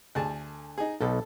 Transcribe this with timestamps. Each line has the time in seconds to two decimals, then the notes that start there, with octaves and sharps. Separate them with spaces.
0.15 D2 G#4 A5
0.78 D#4 G#4
1.01 B1 B2 A4